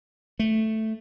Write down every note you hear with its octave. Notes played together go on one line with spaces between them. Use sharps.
A3